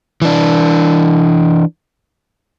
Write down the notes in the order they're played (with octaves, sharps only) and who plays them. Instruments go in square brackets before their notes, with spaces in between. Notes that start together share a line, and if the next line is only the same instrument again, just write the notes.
[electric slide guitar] E3 D4